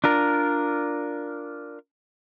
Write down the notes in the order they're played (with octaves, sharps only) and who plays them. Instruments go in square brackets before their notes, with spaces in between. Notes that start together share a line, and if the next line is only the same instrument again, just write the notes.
[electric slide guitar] D4 F4 A#4